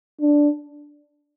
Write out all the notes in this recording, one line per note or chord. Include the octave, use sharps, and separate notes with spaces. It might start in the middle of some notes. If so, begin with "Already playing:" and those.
D4